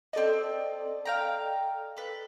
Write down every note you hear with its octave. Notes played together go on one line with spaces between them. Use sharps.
B3 C4 A4 D5 D#5
F5 G5 A#5
A4 B4